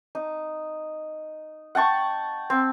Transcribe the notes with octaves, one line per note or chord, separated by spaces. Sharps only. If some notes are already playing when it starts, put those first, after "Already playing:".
D#4
F#5 G5 A5 C#6
C4